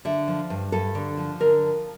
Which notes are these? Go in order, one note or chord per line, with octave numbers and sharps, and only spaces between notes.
D3 E5
F3
G2
G2 A4
D3
F3
D3 A#4
F3